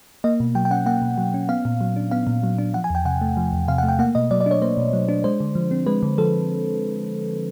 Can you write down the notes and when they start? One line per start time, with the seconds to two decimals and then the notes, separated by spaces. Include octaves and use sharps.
0.24 A#3 D#5
0.40 B2
0.55 F#3 G5
0.65 G5
0.71 C#4 F#5
0.86 A#3 F#5
1.02 B2
1.18 F#3
1.34 C#4
1.49 B3 F5
1.65 A#2
1.81 F#3
1.96 D4
2.11 B3 F5
2.27 A#2
2.43 F#3
2.58 D4
2.74 F3 F#5
2.84 G#5
2.90 E2 G5
3.05 C3 F#5
3.21 A3
3.37 F3
3.53 E2
3.68 C3 F5
3.78 F#5
3.83 A3
3.89 G5
3.99 A#3 F#5
4.15 B2 D#5
4.31 F#3 D5
4.41 D5
4.46 D4 C#5
4.62 A#3 C5
4.77 B2
4.93 F#3
5.09 D4
5.24 G#3 C5
5.40 D3
5.55 F3
5.71 C4
5.87 G#3 B4
6.03 D3
6.18 F3 A4